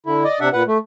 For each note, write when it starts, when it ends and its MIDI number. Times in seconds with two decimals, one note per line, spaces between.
0.06 0.23 50
0.06 0.23 64
0.24 0.39 74
0.24 0.39 75
0.40 0.49 48
0.40 0.49 62
0.40 0.49 76
0.40 0.49 78
0.53 0.63 46
0.53 0.63 71
0.53 0.63 78
0.67 0.78 57